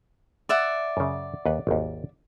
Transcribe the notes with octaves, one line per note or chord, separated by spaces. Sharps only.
D5 E5 F#5
F#2 C#3
D#2 B4
G#1 D#2